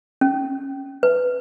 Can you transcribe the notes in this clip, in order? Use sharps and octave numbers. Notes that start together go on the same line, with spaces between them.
C#4
B4